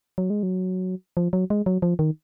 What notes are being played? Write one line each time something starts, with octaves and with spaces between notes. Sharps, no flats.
F#3
G#3
F#3
F3
F#3
G#3
F#3
F3
D#3